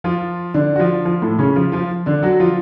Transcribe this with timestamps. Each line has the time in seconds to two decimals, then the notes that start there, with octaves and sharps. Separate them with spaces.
0.04 F3 F4
0.54 D3 D4
0.76 F#4
0.80 F3 F4
1.05 F3 F4
1.22 A2 A3
1.39 C#3 C#4
1.56 F3 F4
1.72 F3 F4
2.06 D3 D4
2.22 F#3 F#4
2.40 F3 F4